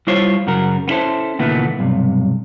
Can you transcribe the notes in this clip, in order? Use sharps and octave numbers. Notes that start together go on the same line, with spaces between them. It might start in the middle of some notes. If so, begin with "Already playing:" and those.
G3 E4 F4 C5 C#5
F#2 C#3 F#4 A#4
B3 C#4 E4 A4 C5
C#2 A#2 D#3 E3 A3 B3
B1 G2 C3